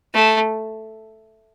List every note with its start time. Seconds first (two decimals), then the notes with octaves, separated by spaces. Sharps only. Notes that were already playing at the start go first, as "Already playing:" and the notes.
0.14 A3